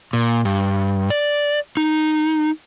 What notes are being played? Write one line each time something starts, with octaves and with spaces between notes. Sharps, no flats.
A#2
G2
D5
D#4